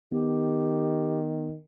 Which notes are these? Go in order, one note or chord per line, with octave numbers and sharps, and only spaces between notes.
D#3 B3 G4